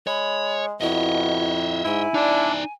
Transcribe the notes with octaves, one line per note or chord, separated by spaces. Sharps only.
G#3 C#5 B5
F2 B2 E4 D#5 E5
G#2 E4 G#5
D4 D#4 D5